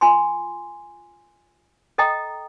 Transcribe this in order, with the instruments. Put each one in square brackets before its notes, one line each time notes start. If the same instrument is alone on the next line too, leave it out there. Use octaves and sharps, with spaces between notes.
[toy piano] F4 G#5 C6
A4 D#5 G5 A#5 D#6